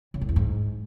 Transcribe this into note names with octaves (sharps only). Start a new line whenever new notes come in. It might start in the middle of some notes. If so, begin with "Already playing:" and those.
C#3
A2
E2
G#2